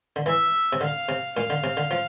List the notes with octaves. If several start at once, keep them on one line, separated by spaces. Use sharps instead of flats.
D3
E3 E5
C3
D3 F5
C3
A#2 F5
D3
C3
D3
F3